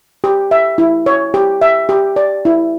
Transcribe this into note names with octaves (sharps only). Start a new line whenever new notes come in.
G4
E5
E4
C#5
G4
E5
G4
D5
E4